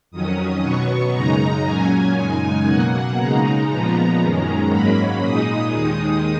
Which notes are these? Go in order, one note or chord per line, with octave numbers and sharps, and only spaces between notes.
F2 D#3 F#3 C#4 D#6
B2 F#3 B3 C#6
F#2 C#3 G#3 D#4 A#5
A#2 F#3 C#4 G#5
F#2 C#3 G#3 D#4
B2 F#3 A#3 F#5
C#3 G#3 D#4 A#5
A#2 F3 B3 A#5
F#2 D#3 G#3 C#4 A#5
G#2 F#3 A#3 C#4 B5
A#2 G#3 D#4 D#6
D#2 D#3 G#3 D#4 D#6